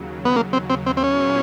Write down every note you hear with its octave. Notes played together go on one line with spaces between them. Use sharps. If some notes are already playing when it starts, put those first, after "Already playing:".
Already playing: D#2 C#3 F#3
B3
A#3
C4
C4
C4
C4
A#2 F#3 B3 C#4 E4 G#4